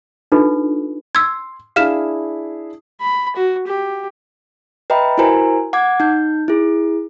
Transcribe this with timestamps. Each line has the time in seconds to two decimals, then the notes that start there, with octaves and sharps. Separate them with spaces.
0.32 D4 D#4 F4 A4 B4
1.15 C6 E6 G#6
1.76 D4 E4 G#4 F5 F6 E7
3.01 B5
3.36 F#4
3.67 G4
4.90 B4 D#5 E5 G5 A#5 B5
5.18 E4 F#4 A#4 C5 G#5 A#5
5.73 F#5 D6 G#6
6.00 D#4 G6
6.48 E4 G#4